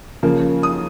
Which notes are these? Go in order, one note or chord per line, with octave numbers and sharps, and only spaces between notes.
C#3 F3 A#3
D#6